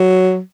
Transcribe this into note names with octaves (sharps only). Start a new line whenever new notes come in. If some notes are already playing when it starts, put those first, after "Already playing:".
Already playing: F#3